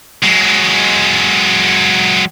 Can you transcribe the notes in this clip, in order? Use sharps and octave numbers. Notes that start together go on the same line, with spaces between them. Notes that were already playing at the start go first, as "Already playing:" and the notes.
F#3 G#3